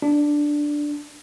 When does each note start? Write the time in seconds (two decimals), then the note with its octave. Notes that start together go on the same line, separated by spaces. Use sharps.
0.02 D4